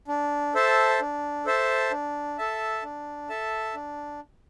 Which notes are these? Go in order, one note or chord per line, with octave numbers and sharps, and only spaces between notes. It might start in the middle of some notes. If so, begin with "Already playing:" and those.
D4
A4 C5 E5 A5
D4
A4 C5 E5 A5
D4
A4 E5 A5
D4
A4 E5 A5
D4